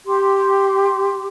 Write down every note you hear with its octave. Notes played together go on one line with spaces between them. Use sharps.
G4 C6